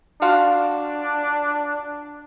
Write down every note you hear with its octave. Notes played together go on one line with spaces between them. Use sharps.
D4 F4 F#4 F5